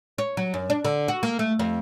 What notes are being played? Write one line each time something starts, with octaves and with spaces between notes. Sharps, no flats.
C#5
F#3
F#2
D4
D3
F#4
A#3
A3
F2